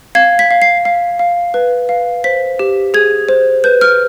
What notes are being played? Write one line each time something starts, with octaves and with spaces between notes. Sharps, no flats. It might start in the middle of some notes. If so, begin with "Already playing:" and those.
F5 G#6
B6
F5
C7
F5
F5
B4
F5
C5 B6
G4
G#4 G#6
C5
B4 G6
F6